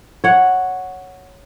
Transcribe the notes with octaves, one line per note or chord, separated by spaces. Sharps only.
C#5 F#5